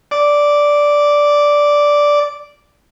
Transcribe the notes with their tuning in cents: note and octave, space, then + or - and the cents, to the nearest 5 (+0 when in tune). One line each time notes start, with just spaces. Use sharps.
D5 -5